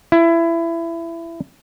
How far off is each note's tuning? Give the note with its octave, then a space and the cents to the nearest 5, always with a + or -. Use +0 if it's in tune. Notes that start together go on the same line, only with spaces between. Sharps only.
E4 +20